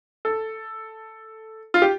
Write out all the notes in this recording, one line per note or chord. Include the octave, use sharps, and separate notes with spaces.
A4
F4
G4